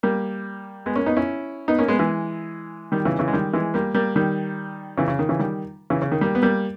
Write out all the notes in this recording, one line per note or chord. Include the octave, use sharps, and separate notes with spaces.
G3 A#3
G#3 B3
A#3 C#4
B3 D#4
C#4 E4
B3 D#4
A#3 C#4
G#3 B3
E3 G#3
D#3 G3
C#3 E3
C#3 E3
G#3
D#3 G3
E3 G#3
G3 A#3
G3 A#3
D#3 G3
C#3 E3
C#3
D#3
C#3 E3
D#3 G3
C#3 E3
C#3
D#3
G3 A#3
B3
G3 A#3